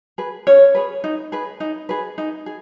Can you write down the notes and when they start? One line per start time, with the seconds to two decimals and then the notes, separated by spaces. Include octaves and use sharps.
0.18 G#4 B4
0.47 C#4 C#5
0.75 G#4 B4
1.04 D#4
1.32 G#4 B4
1.60 D#4
1.89 G#4 B4
2.18 D#4
2.46 G#4